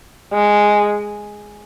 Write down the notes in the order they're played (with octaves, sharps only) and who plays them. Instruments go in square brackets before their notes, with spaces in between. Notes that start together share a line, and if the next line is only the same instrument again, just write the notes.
[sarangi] G#3